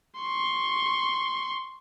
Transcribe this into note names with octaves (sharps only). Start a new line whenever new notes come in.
C6 C#6